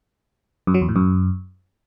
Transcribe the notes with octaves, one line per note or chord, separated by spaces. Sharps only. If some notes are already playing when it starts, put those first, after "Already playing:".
F#2
F#3
E2
A2
F#2